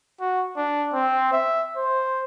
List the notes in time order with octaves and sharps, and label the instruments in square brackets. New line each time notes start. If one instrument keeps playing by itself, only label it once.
[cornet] F#4
D4
C4
E5
C5